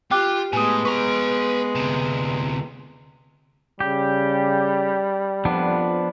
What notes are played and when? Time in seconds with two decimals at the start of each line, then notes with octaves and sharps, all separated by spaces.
0.11 F4 G4 G5 D6 F#6
0.53 A2 G#3 B3 G#5 D#6
0.85 B4 A#5 C#6
1.75 D2 C3
3.80 C#3 G3 G4
5.45 F2 F3 B3 D4